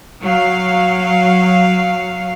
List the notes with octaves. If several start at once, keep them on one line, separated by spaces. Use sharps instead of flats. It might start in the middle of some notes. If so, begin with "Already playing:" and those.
F#3 F5